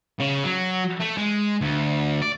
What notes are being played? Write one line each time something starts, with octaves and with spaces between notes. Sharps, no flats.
C#3
F#3
A3
G#3
D2
D5